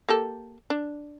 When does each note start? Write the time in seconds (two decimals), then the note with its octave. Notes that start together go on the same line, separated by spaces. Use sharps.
0.09 A#3 G4 A4
0.70 D4